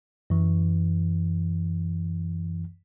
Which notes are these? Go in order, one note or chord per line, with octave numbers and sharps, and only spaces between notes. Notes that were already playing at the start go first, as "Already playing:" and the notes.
F#2 E3